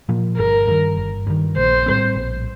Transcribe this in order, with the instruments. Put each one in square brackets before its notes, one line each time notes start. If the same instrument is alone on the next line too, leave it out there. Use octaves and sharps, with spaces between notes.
[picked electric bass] A#2 F3 A#3
[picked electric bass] G1 [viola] A#4
[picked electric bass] G2 D#3
G1
G2 D#3
[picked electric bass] A#1 [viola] C5
[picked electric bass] A2 G3 C4
A#1